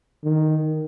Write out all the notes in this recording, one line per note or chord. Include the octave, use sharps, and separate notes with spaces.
D#3